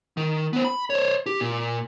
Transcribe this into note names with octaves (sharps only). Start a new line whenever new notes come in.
D#3
B3 C5
B5
C5 C#5
G4
A#2